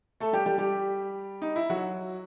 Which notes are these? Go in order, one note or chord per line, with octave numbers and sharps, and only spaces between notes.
A3 A4
G3 G4
G3 G4
G3 G4
D#4
E4
F#3 F#4